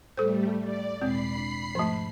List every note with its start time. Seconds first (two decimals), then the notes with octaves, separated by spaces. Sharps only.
0.17 A2 G3 A3 A4 C5
0.60 D5
1.01 E2 B2 G#3 C4 B5 C7
1.36 D4
1.75 G#2 F3 A3 A5